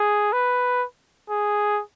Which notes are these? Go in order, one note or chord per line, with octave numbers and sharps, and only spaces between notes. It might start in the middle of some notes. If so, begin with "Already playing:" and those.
Already playing: G#4
B4
G#4